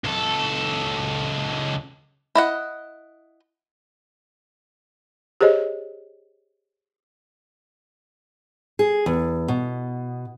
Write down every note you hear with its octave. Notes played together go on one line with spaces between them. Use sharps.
C#2 A4
E4 D#5 F#5
G4 G#4 C5 C#5 D#5
G#4
E2
B2